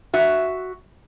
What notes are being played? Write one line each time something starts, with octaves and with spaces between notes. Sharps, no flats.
F#4 E5